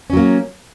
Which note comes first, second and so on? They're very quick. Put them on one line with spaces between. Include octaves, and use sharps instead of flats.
C#4 F#3 A#3